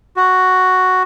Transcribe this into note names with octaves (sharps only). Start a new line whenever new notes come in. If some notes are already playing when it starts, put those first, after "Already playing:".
F#4